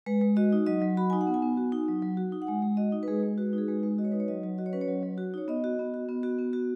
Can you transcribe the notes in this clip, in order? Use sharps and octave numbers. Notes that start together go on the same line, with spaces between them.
G#3 B4
G#3
F#4 D#5
D#4
F#3 D#5
F#3
F#4 B5
D#4 G#5
F#5
B3
G#5
B3
F#4
D#4
F#3
F#3
F#4
D#4
F#5
G#3 G#5
G#3
F#4 D#5
D#4
B4
G#3 G#4
G#3
F#4 B4
D#4
G#4
G#3 B4
G#3
F#4 D#5
C#5
D#4 B4
C#5
F#3 D#5
F#3
F#4 D#5
C#5
C#4 B4
C#5
F#3
F#3
F#4
D#4 C#5
B3 D#5
F#4
B3
F#4
B3
F#4
B3
F#4